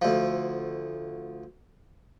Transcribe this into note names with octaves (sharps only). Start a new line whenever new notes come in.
D2 F3